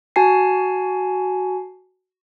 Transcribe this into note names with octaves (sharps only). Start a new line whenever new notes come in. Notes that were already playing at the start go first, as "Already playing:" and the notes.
F#4 G#5 A5 C7